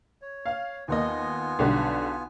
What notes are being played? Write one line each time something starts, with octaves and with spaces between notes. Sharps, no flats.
C#5
F5
D#2 A#3 B3 F4 D#5 G#5
B1 D3 G3